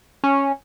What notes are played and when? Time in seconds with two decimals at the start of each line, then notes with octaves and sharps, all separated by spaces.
0.24 C#4